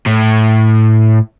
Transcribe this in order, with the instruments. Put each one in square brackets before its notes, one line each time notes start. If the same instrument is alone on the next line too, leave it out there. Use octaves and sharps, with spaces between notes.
[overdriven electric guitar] A2